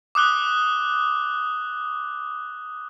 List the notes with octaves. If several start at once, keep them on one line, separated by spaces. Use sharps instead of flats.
D6 D#6 F#6 G7